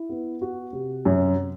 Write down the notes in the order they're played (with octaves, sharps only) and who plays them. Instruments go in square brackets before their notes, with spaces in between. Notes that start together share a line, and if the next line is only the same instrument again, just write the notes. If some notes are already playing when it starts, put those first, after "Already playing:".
Already playing: [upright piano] E4
B3
F#4
C3
F#2